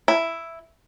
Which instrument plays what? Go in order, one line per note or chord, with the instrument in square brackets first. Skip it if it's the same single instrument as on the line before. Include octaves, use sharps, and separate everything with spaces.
[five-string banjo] E4